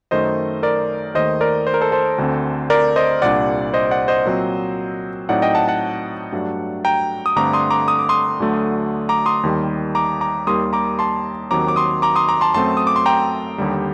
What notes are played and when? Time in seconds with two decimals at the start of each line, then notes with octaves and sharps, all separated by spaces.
0.11 F#2 D#3 A3 C5 D#5
0.63 A#4 D5
1.14 D#2 D#3 A3 C5 D#5
1.41 A#4 D5
1.67 C5
1.74 A#4
1.81 A4 C5
1.92 A4 C5
2.18 D2 D3 A3 C4
2.70 A#4 D5
2.96 C5 D#5
3.22 C2 A#2 G3 D4 D5 F#5
3.74 C5 D#5
3.91 D5 F#5
4.08 C5 D#5
4.25 A#2 F#3 C4
5.29 A2 F#3 C4 D#4 D5 F#5
5.42 D#5 G5
5.55 F#5 A5
5.68 F#5 A5
6.32 G2 F#3 A3 D4
6.85 G5 A#5
7.26 D#6
7.36 G2 D3 A3 C4 A#5 D6
7.53 C6 D#6
7.70 A#5 D6
7.88 D#6
7.99 D6
8.09 C6 D#6
8.40 D2 D3 F#3 A3
9.09 A#5 D6
9.26 C6 D#6
9.43 D#2 D#3 G3
9.95 A#5 D6
10.21 A#5 D6
10.47 D#2 D#3 G3 A#3 C6 D#6
10.73 A#5 D6
10.99 A5 C6
11.51 D#2 D#3 F#3 C4 A#5 D6
11.68 D6
11.76 C6 D#6
12.02 A#5 D6
12.16 C6 D#6
12.28 A#5 D6
12.41 A5 C6
12.54 F#2 F#3 A3 C4 A5 C6
12.77 D#6
12.87 D6
12.96 C6
13.06 G5 A#5
13.58 D#2 D3 G3